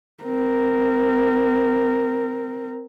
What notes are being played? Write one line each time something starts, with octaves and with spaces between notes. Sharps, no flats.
C4 A#4